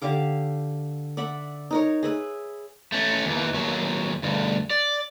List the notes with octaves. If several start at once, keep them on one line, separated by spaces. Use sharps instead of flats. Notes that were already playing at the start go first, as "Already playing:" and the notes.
D3 G4 F5 D6
D5 E5 F#5 B5
D#4 A#4 C#5
G#4 B4 E5
A3 C#4
D#2 E3
D#2 F#3
D2 G2
D5